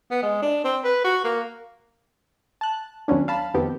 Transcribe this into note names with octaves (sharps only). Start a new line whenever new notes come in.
B3
G#3
D4
C4
B4
F#4
A#3
A5 F#6
D#2 F#3 B3 C#4 D4
F5 A5 B5
F2 D#3 B3 C4 G4